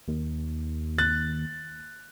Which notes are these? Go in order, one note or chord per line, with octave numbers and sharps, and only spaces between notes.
D#2
F#6 A6